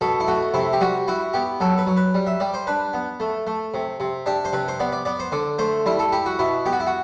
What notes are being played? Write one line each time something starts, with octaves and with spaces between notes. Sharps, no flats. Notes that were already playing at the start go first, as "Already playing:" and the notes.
B2 A4
E4
A3 F#4
C3 E4
G4
G3 F#4
E4 F#4
B3 G4
F#3 A4
B4
F#3
B4
G3
E5
G3 D5
C5
D4 B4
B3
A3
A3
C3
C3
D4 G4
C5
C3 B4
C5
B3 D5
D5
B3 D5
C5
D3 D5
A3 C5
G3 E4
A4
E4 G4
F#4
B2 E4
B3 G4
F#4
E4
F#4